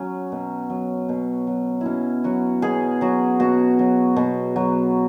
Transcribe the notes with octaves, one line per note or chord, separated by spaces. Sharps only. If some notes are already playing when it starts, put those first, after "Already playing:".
Already playing: F#3 C#4
B2
F#3
B2
F#3
B2 C#4 E4
F#3 F#4
B2 G#4
F#3 F#4
B2 F#4
F#3
B2
F#3